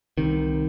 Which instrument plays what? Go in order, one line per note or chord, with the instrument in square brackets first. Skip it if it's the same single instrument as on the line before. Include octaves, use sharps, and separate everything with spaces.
[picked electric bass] C2 C3 D#3